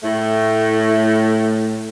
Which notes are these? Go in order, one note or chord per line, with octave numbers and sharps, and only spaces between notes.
A2 A3